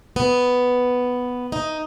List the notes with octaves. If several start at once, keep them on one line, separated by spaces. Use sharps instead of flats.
B3
D#4